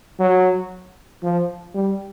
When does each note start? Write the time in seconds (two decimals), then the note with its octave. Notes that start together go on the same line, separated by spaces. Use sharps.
0.19 F#3
1.23 F3
1.74 G3